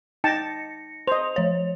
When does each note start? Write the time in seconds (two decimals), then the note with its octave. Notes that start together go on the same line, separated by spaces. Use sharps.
0.24 D#4 G5 A5 A#6 C#7
1.07 C5 D#5 F7
1.36 F3 C#5